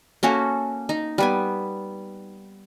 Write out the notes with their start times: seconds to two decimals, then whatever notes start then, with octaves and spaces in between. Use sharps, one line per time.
0.23 A#3 C#4 F#4 A4
0.89 D#4
1.18 G3 B3 G#5